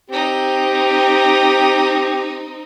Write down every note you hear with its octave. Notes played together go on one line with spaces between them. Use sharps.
C4 D#4 G4